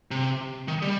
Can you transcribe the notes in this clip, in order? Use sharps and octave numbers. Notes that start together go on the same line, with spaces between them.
C3
D#3
G3